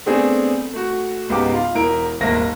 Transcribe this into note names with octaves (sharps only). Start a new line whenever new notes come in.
A3 B3 C4 D4 G#4
A3 F#4
C#2 G#2 B3 G4 D6
F4
E1 E4 A#4 D7
D#1 G#1 A#3 E5 A#6